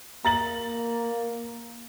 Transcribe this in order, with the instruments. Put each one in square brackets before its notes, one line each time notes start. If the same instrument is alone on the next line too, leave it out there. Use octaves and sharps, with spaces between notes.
[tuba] A#3 [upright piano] A#5 A6 F#7